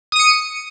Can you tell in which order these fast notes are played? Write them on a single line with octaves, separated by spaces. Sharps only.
D#6 D#7 C#7